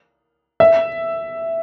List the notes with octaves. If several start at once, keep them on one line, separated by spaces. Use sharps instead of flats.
E5